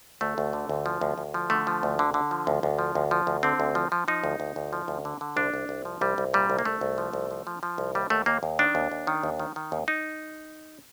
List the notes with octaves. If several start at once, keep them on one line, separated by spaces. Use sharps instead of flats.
D2 A3
D2
D3
D2
F3
D2
D2
F3
D3 A3
F3
D2
D3
D3
F3
D2
D2
F3
D2
F3
D2
D3 C4
D2
F3
F3
F3 D#4
D2
D2
D2
F3
D2
D3
D3
C2 D4
C2
C2
F3
C2 G3
C2
A#2 G3
C2
A#3
C2 A3
C2
F3
C2
F3
F3
F3
C2
D#2 G3
D#2 A3
D#2 A#3
D#2
D#3 D4
D#2
D#2
D#3
D#2
D#3
D#3
D#2
D#4